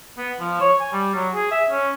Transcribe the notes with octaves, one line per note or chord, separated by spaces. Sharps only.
B3
F3
C#5
G#5
G3
F#3
G#4
E5
C#4